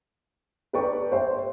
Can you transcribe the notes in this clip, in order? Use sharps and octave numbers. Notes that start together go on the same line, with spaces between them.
A4 B4 D5 G5 A#5 C#6
C5 E5 G5